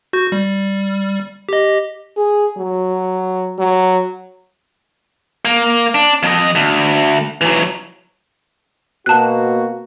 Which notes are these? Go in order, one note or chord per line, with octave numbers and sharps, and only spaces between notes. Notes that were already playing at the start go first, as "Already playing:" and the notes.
F#4 G6
G3
G4 D#5
G#4
F#3
F#3
A#3
D4
F2 D#5
D2
E3 F#3
B2 A#3 F#4 A5 F#6